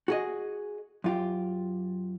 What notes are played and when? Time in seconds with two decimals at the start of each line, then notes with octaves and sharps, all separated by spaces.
0.08 F#4 G#4 D#5
1.04 F#2 F4 G4